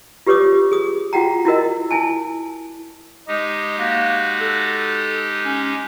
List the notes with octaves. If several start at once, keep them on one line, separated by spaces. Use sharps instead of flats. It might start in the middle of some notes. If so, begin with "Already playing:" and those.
F4 G4 B4 C#5 D6 D#6
G#4 D#6
F4 F#4 F#5 G5 A#5
E4 F#4 A#4 D#5
E4 G#5 A5
G#3 D#4 G4 D#5
A#3 F#4
A4
C#4